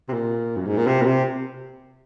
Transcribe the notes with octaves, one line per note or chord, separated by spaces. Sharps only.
C3
A#2
F#2
G#2
A#2
C3
A#2
C3